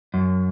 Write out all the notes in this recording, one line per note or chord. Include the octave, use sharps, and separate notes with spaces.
F#2